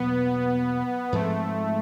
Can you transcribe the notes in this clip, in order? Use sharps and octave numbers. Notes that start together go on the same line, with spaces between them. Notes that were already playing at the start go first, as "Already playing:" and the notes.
Already playing: E2 B2 F#3 A#3 B3
G#2 F3 G#3 A3 C4